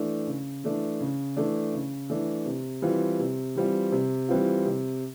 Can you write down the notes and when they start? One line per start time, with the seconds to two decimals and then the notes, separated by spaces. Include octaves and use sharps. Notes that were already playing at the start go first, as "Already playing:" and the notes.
Already playing: E3 A3 D4
0.27 C#3
0.64 E3 A3 D4
1.00 C#3
1.36 E3 A3 D4
1.74 C#3
2.10 E3 A3 D4
2.46 C3
2.82 E3 G3 C4 F4
3.19 C3
3.56 E3 G3 C4 F4
3.92 C3
4.28 E3 G3 C4 F4
4.66 C3